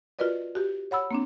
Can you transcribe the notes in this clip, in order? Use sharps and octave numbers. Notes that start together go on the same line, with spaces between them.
F4 F#4 A#4 B4 D5 D#5
F#4 G4
C#5 F#5 B5 E6
A#3 C4 D4